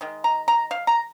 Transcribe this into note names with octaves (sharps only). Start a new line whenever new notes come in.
D#3 G#3
A#5
A#5
F5
A#5